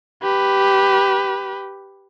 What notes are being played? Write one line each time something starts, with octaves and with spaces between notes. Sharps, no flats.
G4 B4